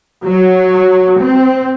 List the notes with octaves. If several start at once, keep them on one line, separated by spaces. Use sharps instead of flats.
F#3
C4